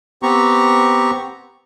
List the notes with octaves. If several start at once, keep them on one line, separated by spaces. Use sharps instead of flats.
B3 C4 G4 A#5 C#6